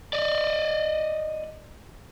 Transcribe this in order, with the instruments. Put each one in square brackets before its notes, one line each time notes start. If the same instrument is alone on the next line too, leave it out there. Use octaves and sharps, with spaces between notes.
[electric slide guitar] D5 D#5